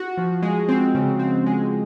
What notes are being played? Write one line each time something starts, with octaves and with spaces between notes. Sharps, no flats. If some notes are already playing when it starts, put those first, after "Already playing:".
Already playing: F#4
F3
G#3
C4
C#3
C4
G#3